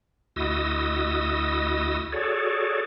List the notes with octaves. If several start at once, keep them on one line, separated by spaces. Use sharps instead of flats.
D2 E4 F#4 D#5 D#6 E6
F#4 G#4 A4 C#5 D5